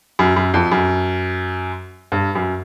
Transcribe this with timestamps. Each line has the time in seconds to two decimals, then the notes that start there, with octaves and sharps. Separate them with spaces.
0.19 F#2
0.36 F#2
0.54 F2
0.72 F#2
2.12 G2
2.35 F#2